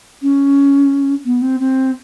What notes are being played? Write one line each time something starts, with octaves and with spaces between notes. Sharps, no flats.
C#4
B3
C4
C4